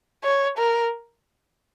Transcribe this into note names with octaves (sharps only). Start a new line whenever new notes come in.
C#5
A#4